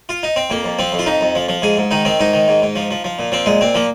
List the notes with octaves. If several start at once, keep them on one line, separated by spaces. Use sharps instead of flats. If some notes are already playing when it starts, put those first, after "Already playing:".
F4
D#4
C4
F2 A#3
F2
F3 C4
F2
F4
F2 D#4
F2
F3
F3
G#2 G#4
G#2
D#3 D#4
D#3 C4
G#2 D#4
D#3
G#2
G#2
F3
F3
F3
A#2
F3 C4
A#2 G#3
A#2 C4
F3 A#3